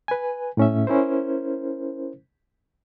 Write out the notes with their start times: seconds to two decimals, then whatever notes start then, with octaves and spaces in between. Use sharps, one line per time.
0.08 B4 G#5
0.57 A2 C#4 E5
0.87 C#4 E4 A#4 C5